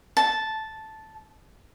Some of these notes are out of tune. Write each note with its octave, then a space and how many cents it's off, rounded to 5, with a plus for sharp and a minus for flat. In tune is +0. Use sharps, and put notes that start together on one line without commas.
A5 -5